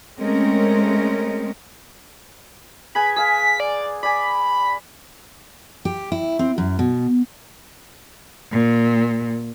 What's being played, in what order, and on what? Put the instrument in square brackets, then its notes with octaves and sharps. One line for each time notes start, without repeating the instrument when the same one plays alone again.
[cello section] G#3 A3 C4 C#4 A#4
[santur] G#4 B4 G#5 [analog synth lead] B5
[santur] G#4 F5 [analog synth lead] B6
[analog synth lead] D5
[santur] D5 G#5 [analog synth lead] B5
[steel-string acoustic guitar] G4
E4
C4
F#2
B2
[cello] A#2